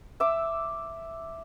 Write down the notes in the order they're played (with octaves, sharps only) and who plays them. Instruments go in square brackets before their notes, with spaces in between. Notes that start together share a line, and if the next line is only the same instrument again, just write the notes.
[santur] E5 D6 E6